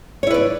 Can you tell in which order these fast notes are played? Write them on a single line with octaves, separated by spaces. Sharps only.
C#5 E4 B4 D5